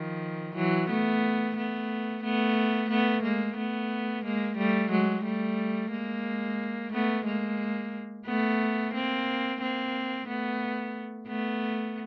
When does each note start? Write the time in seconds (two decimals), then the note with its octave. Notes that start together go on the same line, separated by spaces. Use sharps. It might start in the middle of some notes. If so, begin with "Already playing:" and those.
Already playing: D#3 F3
0.55 E3 F#3
0.90 A3 B3
1.56 A3 B3
2.23 A3 B3
2.90 A3 B3
3.23 G#3 A#3
3.57 A3 B3
4.25 G#3 A#3
4.57 G3 A3
4.91 F#3 G#3
5.25 G3 A3
5.92 G#3 A#3
6.93 A3 B3
7.25 G#3 A#3
8.26 A3 B3
8.94 A#3 C4
9.60 A#3 C4
10.27 A3 B3
11.28 A3 B3